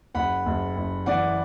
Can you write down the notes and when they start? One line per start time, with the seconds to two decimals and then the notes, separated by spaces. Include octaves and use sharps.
0.14 F#1 F#5 B5
0.46 F#1
0.76 F#1
1.06 E3 D5 F#5